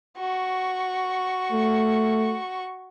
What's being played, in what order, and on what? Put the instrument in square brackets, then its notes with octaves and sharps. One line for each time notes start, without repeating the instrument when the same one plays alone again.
[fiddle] F#4 C#6
[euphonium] A3